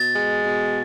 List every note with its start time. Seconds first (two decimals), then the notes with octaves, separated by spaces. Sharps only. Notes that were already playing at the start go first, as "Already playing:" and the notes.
Already playing: B2 A6
0.16 G#3
0.45 B2